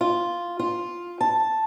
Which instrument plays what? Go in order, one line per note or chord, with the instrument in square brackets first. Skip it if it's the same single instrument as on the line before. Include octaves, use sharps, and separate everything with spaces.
[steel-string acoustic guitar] F4
F4
A5